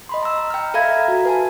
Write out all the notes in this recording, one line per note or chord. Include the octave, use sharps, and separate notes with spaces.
D#5 B5 C6
A#5 E6
G5 F6
A4 E5 F5 A#5 B5 G#6
F#4
B4 G#5 A5